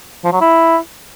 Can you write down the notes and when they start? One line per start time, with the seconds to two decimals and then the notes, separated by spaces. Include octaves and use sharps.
0.24 F3
0.33 F#3
0.41 E4